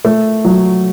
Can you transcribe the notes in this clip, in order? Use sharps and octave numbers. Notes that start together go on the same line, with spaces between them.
A3
F#3